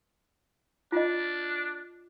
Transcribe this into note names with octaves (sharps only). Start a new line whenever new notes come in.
D4 F4 D#5